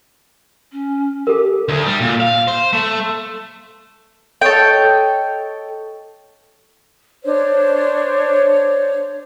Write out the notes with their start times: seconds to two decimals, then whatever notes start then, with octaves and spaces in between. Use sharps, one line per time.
0.72 C#4
1.27 G4 A4 A#4
1.69 D2
1.86 G3
2.00 A#2
2.20 F5
2.48 C5
2.73 A3
4.41 A4 C#5 D#5 G5
7.24 D4 C5 C#5